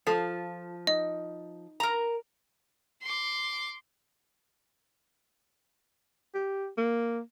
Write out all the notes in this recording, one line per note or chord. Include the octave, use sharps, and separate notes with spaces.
F3 F4 A4
D#4 D#5
A#4 A#5
C6 D6
G4
A#3